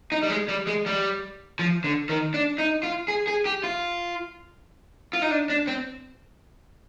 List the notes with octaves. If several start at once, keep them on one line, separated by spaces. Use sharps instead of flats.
D#4
G3
G#3
G3
G#3
G3
F3
D3
D#3
D4
D#4
F4
G#4
G#4
G4
F4
F4
D#4
D4
D4
C4